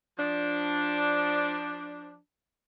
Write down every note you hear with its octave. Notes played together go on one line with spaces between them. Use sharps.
F3 D4